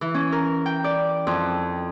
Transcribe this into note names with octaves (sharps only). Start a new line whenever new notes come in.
E3
C#4
A#4
G5
D5
F2